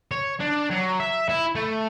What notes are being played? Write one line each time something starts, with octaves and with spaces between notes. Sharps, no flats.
C#5
D4
F#3
E5
E4
A3